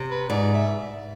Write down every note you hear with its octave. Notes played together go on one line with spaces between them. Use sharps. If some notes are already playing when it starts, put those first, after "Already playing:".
Already playing: C3
B4
G#2 D5
E5